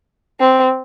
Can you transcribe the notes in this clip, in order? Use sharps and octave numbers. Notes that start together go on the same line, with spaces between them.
C4